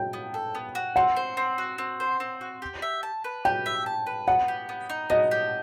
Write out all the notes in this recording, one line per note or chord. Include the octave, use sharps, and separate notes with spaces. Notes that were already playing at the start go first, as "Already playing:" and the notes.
Already playing: G5
B3
A4
B3
F#4
C4 F#5
C5
C4
F#4
C4
C5
C4
F#4
G4
E5
A5
B4
G4 G5
E5
A5
B4
B3 F#5
G4
B3
D#4
B3 D#5
G4